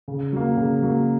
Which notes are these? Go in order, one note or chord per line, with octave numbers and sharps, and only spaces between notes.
C#3
F#3 A#3
C#3
F#3 A#3